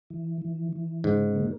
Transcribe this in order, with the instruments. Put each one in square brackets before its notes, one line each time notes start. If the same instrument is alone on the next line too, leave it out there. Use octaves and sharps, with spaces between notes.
[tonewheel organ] E3
E3
E3
[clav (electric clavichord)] G#2 [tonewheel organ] C#3
[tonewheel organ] A#3